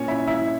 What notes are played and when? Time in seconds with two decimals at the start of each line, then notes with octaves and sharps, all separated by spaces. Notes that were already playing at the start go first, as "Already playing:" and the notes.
Already playing: A#2 C#4 C#5
0.08 E4 E5
0.27 E4 E5